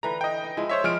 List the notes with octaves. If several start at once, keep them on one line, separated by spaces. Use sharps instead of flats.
D3 E3 B4 A#5
D#5 G5
D#4
F3 G#3 E4
C5 C#5 E5
F3 G#3 B3 F6 D7